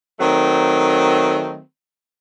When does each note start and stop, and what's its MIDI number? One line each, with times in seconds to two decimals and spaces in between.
0.20 1.60 51
0.20 1.60 54
0.20 1.60 57
0.20 1.60 60